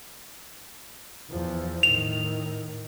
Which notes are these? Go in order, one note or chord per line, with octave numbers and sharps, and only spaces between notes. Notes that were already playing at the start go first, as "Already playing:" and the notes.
E2 F3
A2 D#3 F7